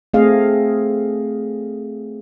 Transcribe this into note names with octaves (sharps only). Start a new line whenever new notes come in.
A3 C4 G#4 D#5 F5